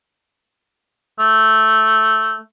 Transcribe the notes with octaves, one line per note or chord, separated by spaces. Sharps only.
A3